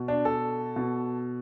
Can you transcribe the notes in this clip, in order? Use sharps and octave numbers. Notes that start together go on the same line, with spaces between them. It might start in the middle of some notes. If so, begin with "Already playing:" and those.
Already playing: B2
D4
A4
B2